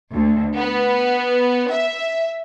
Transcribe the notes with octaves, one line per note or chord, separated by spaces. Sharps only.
D2
B3
E5